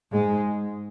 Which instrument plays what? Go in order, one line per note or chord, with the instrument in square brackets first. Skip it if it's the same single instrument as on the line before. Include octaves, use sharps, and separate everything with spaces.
[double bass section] G#2 G#3